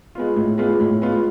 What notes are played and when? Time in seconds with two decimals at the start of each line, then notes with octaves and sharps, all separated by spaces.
0.15 G#3 B3 F4
0.36 A2
0.58 G#3 B3 F4
0.80 A2
1.01 G#3 B3 F4